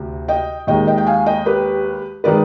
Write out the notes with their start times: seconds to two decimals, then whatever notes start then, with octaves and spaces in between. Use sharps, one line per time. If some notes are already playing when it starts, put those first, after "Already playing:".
Already playing: D2 C3
0.28 D#5 G5
0.67 D#2 D#3 G#3 D#5 G5
0.87 D#5 G5
0.98 G5
1.07 F5 G#5
1.26 D#5 G5
1.46 G4 B4
2.24 D#3 G#3 B4 D5